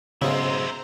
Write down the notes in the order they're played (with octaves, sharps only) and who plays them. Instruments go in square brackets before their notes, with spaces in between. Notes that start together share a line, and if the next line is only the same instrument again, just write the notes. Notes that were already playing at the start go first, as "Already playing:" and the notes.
[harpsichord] B1 G#2 G#3 [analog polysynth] C#3 [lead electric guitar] C4 E4 [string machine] C5 A#5